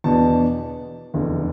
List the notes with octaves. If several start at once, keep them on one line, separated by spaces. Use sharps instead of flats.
E2 B2 B3 D4 A5
F1 E2 D3